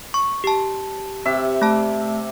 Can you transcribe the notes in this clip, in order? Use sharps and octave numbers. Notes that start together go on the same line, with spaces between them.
C#6
G4 A5
C3 E5
A3 A5